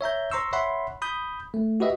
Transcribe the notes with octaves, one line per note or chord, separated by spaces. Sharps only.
C#5 E5 A#5 G6
C5 A#5 C6 C#6 E6
C#5 E5 F#5 B5 C6
B5 D#6 G6
A3
F#4 G4 B4 D#5 E5